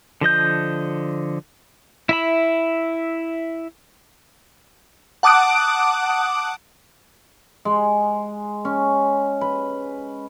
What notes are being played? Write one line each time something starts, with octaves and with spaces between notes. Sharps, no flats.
D3 F3 D#5 G6
E4 E5 B5
F#5 A5 D6 D#6 F#6 D7
G#3
C#4
B4